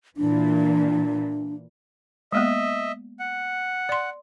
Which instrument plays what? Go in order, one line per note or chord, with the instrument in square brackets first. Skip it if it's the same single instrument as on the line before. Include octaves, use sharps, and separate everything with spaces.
[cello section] A#2 E3 [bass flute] D4
[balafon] G#3 A#3 B3 [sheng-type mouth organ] D#5 E5
[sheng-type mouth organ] F#5
[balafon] D5 C6